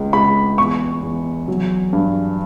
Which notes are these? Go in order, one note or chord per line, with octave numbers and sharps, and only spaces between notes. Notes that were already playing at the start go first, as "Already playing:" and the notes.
Already playing: C#2
C#2 B5
E2 C#6
E2
F#3
G2